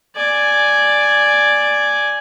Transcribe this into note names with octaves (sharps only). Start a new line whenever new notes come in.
D5 G#5